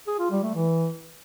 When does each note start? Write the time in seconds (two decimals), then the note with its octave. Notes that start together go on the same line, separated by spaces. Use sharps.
0.07 G#4
0.19 F4
0.31 G3
0.43 A3
0.55 E3